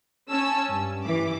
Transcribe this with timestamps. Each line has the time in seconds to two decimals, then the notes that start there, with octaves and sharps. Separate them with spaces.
0.30 C#4 A5 E6
0.69 G2
1.06 G2 E3 D6